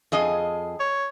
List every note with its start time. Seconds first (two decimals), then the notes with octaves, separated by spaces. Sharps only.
0.12 F2 G#4 D#5
0.80 C#5